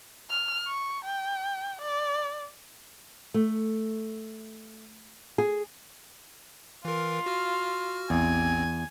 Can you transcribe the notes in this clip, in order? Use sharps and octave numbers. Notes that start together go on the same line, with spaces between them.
F6
C#6
G5
D5
A3
G#4
E3 F4 A#4
F#4 F6
A1 E2 C4 G#5